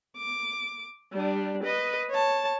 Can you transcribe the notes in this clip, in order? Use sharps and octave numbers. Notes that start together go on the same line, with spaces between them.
D6
G3 D4
B4 D#5
C#5 A5